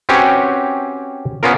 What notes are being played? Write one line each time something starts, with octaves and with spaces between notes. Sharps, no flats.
C4 C#4 F#4 G4 B4 C#5
B3 C#4 F4 A#4